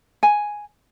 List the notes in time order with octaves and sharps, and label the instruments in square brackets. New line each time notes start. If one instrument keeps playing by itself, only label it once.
[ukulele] G#5